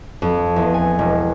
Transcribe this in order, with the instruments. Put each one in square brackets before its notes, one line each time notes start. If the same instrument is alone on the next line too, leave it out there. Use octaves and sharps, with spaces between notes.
[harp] F2
E2
G#5
E1